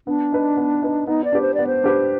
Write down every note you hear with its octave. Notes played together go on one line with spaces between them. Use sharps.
B3 D4
D#4 B4
B3
D#4 B4
B3 D#4
D5
D4 G4 B4
C5
B3 D5
C5
D4 G4 B4